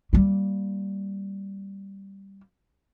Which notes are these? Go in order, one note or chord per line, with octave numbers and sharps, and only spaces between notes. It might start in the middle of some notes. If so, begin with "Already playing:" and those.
G3 A#3